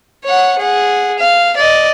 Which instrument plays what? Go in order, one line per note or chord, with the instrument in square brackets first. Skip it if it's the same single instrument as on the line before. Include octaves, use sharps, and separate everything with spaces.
[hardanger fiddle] C#5 F#5
G#4 F#5
F5
D5 D#5